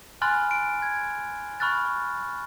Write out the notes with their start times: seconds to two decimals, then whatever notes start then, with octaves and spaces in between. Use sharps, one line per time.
0.22 G#5 B5 C6 F6 F#6 A6
0.51 D7
0.82 G#6
1.60 B5 C#6 F6 F#6 A6